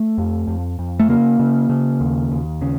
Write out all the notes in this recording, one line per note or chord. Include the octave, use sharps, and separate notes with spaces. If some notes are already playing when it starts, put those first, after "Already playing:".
Already playing: A3
F2
F2
F2
A3
C#3 A#3
C#3
C#3
D#2
D#2
C#3